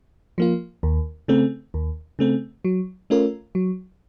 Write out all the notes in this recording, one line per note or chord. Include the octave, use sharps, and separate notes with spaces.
F3 A#3 F4
D#2
C#3 A3 C4
D#2
C#3 A3 C4
F#3
A3 C#4 F4 A#4
F#3